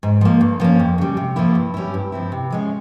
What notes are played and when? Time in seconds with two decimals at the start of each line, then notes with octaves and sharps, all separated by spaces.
0.03 G#2
0.21 F3 A#3
0.41 G2
0.60 F3 A#3 C#4
0.79 F2
0.98 C#3 G3
1.17 C3
1.36 F3 A#3 E4
1.55 G2
1.74 G3 C#4 E4
1.94 G2
2.12 F3 C4 E4
2.32 C3
2.50 F3 G#3 C#4